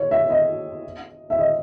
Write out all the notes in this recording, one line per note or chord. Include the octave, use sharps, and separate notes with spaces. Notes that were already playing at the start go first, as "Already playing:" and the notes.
Already playing: C#5
E5
D#5
E5
D#5